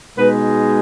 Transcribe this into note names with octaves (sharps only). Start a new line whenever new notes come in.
B2 G#3 D#4 B4